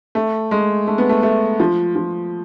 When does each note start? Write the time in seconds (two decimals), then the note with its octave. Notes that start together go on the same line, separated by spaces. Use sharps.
0.15 A3
0.51 G#3
0.87 A3
0.98 B3
1.09 A3
1.23 A3
1.60 F3
1.96 F3